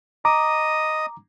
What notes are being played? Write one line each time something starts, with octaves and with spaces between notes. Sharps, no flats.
D#5 A#5 D6 D#6